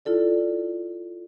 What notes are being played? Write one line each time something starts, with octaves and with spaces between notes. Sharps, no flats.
E4 F4 A4 D5